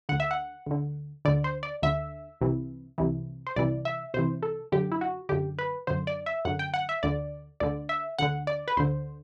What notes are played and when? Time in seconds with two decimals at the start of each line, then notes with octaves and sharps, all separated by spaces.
0.09 D2 D3 F#5
0.20 E5
0.31 F#5
0.66 D2 D3
1.25 D2 D3 D5
1.44 C5
1.63 D5
1.83 D2 D3 E5
2.41 C2 C3 E3
2.98 C2 C3 E3
3.47 C5
3.56 C2 C3 E3 D5
3.85 E5
4.14 C2 C3 E3 C5
4.43 A4
4.72 F#2 D3 G4
4.92 E4
5.01 F#4
5.29 F#2 D3 G4
5.59 B4
5.87 F#2 D3 C5
6.07 D5
6.26 E5
6.45 F#2 D3 F#5
6.59 G5
6.74 F#5
6.89 E5
7.03 D2 D3 D5
7.60 D2 D3 D5
7.89 E5
8.19 D2 D3 F#5
8.47 D5
8.68 B4
8.77 D2 D3 C5